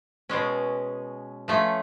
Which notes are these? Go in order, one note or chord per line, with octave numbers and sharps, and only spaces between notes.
B2 G#3 C#4
F3 A3 C#4